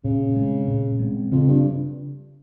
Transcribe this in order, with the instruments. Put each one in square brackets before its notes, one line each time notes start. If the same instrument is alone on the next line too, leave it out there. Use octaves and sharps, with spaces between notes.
[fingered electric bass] A#2 [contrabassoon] C#3
[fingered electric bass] G#3 C4
A#2
G#3 C4
[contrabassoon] F2 [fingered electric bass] C#3
[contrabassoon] G2